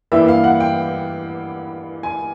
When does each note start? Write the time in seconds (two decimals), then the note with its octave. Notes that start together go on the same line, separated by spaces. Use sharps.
0.12 G2 E3 G3 A#3 E5
0.28 F5
0.44 F#5
0.60 G5
2.03 G#5